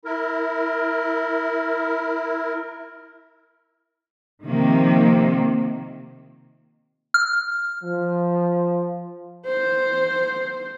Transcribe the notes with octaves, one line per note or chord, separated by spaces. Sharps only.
E4 A#4
C3 D#3 F3 A#3
F6
F3
C5